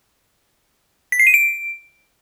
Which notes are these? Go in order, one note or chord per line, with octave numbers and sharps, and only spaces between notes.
B6
C7
D#7
D7